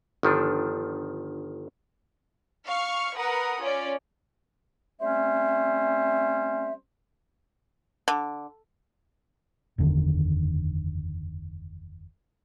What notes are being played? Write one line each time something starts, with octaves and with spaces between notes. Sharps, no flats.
G1 D#3 F3 D4
F5 C#6 F6
A#4 B4 F#5 D#6
C#4 F4 D5
G3 A3 C4 C#4 C5 E5
D3
F#1 E2 D3 D#3